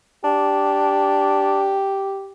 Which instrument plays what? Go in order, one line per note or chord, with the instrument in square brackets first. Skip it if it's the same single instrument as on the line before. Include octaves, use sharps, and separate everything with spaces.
[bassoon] D4 [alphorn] G4